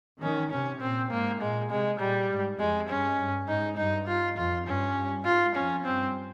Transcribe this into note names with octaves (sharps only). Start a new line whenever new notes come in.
D#3 C#4
C3 C#4
A#2 C4
G#2 A#3
A#2 G#3
C3 G#3
A#2 G3
G#2
F2 G#3
G2 C#4
G2
G#2 D#4
G2 D#4
F4
F2 F4
G2 C#4
G#2 F4
F2 C#4
G2 C4